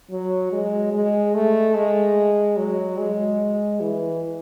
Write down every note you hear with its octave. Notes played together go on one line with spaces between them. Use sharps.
F#3
G#3
G#3
A3
G#3
F#3
G#3
E3